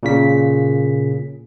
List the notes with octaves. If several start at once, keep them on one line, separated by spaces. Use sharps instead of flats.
A#2 C#3 B6